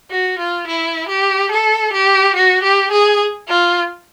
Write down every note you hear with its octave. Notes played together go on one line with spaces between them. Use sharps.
F#4
F4
E4
G4
A4
G4
F#4
G4
G#4
F4